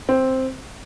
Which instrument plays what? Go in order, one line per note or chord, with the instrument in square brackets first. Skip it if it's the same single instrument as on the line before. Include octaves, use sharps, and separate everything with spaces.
[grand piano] C4